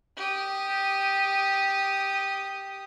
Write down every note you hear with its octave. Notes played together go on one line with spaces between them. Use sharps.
G4 D#6